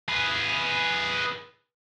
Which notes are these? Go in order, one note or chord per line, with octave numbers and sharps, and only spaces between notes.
G#4 B4